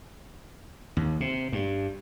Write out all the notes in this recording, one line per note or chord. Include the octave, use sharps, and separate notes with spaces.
D#2
C3
G2